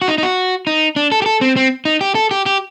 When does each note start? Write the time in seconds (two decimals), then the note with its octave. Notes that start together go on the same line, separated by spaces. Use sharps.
0.02 F#4
0.08 D#4
0.18 D#4
0.23 F#4
0.67 D#4
0.96 D4
1.12 A4
1.22 G4
1.26 A4
1.41 C4
1.57 C4
1.85 D#4
2.01 G4
2.15 A4
2.31 G4
2.46 G4